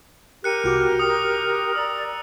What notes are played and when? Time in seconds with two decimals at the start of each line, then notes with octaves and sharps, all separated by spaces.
0.44 G4 A#4 F#6 C#7 D#7
0.64 C2 F#4 D6
0.99 D#6 C#7
1.75 D5 A#5 E6